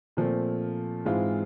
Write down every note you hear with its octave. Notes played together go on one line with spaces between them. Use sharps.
A#2 F3 A3 C4
G#2 E3 G#3 C4 F4